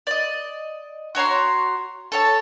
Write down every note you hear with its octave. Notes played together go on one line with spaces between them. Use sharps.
D5 D#5
F#4 C#5 A#5 C6
A4 C#5 A5